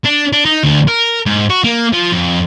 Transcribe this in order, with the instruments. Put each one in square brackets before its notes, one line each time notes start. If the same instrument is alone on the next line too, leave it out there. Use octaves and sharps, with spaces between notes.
[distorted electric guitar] D4
D4
D#4
D2
A#4
G#2
F#4
A#3
F3
F2